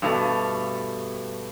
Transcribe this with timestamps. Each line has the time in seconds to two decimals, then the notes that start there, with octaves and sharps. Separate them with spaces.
0.02 G2 B2 A3